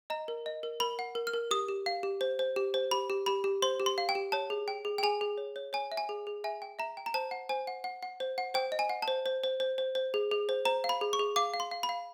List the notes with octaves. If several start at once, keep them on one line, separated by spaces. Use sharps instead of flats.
D#5 A#5
A#4
D#5
A#4
A#4 B5
F#5
A#4
F6
A#4
G4 D#6
G4
F5
G4
C5
C5
G4
C5
G4 B5
G4
G4 B5
G4
C5 C6
G4
C6
F5
G5
G4
C#5 A5
G#4
G5
G#4
G5
G#4 G#5
G#4
C#5
C#5
C#5 G#5
E5
G#5
G#4
G#4
E5 G#5
G5
E5 A#5
G5
A#5
C5 A5
F#5
C5 G#5
F#5
F#5
F#5
C5
F#5
C5 G5
D#5
G#5
F#5
A5
C5
C5
C5
C5
C5
C5
G#4
G#4
C5
C5 A#5
F5
B5
G#4
C#6
G#4
F5 D6
F5
C6
F5
B5
F5